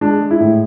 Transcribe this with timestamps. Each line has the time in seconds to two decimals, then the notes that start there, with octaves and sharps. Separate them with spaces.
0.01 G#3 D4
0.20 G#3
0.31 E4
0.40 A2